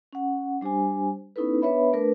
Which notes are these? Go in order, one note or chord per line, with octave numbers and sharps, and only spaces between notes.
C#4 F#5
G3 D4 G4 C5 G#5
B3 C#4 D#4 E4 A4 B4
B3 D4 B4 C#5 E5 B5
A3 D4 A#4 B4